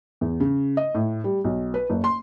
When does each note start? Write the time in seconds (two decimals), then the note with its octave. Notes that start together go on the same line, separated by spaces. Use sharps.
0.21 E2
0.40 C#3
0.77 D#5
0.95 A2
1.24 G3
1.44 B1
1.74 B4
1.90 F#1
2.04 C6